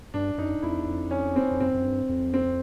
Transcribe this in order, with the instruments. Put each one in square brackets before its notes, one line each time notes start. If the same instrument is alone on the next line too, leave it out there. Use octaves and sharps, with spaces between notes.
[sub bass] G2 [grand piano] D4
[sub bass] F#2 [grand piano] D#4
[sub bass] F2 [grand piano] E4
[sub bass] E2
F2
[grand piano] C#4
C4
[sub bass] F2
[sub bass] F#2 [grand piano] C4
[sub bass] F#2
G2
F2
[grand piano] C4